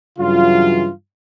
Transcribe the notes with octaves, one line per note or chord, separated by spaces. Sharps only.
G2 C#3 E3 F#3 F4